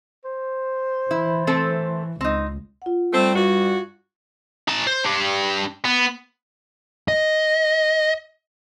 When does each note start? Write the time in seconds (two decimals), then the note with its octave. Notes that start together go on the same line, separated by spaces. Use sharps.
0.25 C5
1.11 E3 E4
1.47 A3 C4 A4
2.21 C#2 C4 D#4
2.82 F4 F#5
3.13 G3 A3 C4
3.35 G2 F#4
4.68 D#4 A5
4.87 C5
5.05 D4 G4
5.85 B3
7.08 D#5